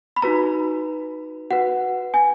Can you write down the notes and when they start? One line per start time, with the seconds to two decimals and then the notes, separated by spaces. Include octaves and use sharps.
0.16 B5
0.22 D#4 F#4 B4 A#5
1.51 F#4 B4 F#5
2.14 G#5